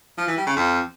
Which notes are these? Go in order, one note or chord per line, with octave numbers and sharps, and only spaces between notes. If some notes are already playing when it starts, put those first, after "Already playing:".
F3
E3
G3
C#3
F2